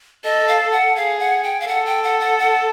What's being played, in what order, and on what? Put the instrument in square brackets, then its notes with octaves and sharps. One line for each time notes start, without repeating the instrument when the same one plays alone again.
[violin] A4 [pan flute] D#5
[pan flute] F5
F#5
[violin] G#4 [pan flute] F5
[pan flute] F#5
G5
F5
[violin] A4 [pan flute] F#5
[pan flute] G5
F#5
F#5
F#5